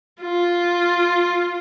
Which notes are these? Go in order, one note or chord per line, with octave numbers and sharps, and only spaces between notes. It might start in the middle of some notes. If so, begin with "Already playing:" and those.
F4